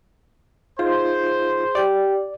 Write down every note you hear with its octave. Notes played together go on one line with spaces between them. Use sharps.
D#4 F4 G#4 C5
G4 D5 G5